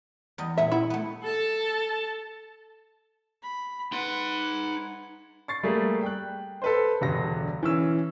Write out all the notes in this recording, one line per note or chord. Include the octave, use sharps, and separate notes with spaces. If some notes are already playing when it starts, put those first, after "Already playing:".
E2 G3 D#5
A#2 B3 E4 E5
B3 E4
A3 B3
A4 A5
B5
D#4 B4 F#5 C6
C#6 A6 C7
G3 A3 A#3 G#4
G5 F#6
A4 B4 C5
E1 G2 D3 A#6
E3 C#4 E6